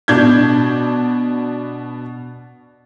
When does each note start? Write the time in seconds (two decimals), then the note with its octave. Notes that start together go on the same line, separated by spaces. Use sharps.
0.08 B2 D4 G6 G#6